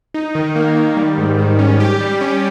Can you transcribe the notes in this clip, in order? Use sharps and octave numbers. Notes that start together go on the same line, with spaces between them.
D#4
D#3
A#3
D#3
G3
G#2
D#3
C#4
G4
G3
C#4